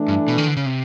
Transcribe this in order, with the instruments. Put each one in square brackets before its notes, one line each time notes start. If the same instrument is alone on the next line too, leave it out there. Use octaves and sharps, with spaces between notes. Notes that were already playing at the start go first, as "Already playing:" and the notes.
Already playing: [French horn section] E3 A3 D4
[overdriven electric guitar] G2
B2
D#3
D3
C#3
C3